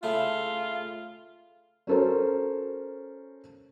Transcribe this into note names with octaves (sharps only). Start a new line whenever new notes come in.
C#3 A3 E4 F4
C#4 F#4 A4 A#4 C5